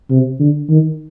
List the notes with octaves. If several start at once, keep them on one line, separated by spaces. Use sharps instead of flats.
C3
D3
D#3